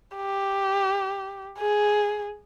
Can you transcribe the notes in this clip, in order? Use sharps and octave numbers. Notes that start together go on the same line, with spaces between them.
G4
G#4